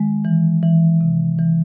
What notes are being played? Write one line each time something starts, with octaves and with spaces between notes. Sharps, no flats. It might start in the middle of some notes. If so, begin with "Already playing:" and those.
Already playing: D#3 G#3
E3
E3
C3
E3